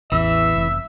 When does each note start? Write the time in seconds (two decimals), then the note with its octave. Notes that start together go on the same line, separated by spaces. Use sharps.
0.12 A1 E2 E3 E5 E6
0.56 F1